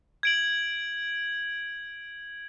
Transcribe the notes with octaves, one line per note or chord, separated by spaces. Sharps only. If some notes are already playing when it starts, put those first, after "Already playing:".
G#6 D7 F#7